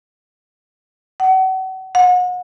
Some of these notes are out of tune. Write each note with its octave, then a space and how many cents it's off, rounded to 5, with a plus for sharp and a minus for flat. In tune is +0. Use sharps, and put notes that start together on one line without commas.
F#5 +35
F#5 -35